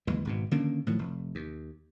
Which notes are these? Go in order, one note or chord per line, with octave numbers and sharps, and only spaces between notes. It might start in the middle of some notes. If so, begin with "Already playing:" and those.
F#1 D#2 E3 G#3
G#1 G#2 B2
D3 D#3 A#3 C#4
A2 D#3 F3 F#3
F1
D#2